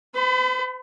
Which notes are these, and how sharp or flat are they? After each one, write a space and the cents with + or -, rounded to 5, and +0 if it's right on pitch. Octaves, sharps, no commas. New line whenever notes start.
C5 -40 B5 +30